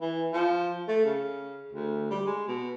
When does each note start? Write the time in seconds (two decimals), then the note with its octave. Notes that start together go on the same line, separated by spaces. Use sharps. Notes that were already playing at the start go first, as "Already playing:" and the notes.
0.02 E3
0.33 F3
0.88 A3
1.05 C#3
1.72 D2
2.11 G3
2.26 G#3
2.48 B2